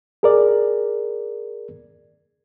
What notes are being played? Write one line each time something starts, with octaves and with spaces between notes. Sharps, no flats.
G#4 A#4 D5